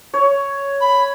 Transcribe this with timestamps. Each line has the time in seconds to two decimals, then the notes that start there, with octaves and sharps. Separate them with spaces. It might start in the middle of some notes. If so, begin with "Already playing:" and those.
0.14 C#5
0.81 B5